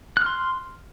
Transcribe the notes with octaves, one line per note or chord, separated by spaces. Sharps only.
C6 F6 F#6